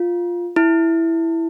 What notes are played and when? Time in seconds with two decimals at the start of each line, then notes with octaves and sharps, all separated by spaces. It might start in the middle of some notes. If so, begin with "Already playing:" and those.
Already playing: F4
0.56 E4